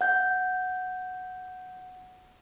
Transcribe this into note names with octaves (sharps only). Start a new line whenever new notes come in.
F#5 G6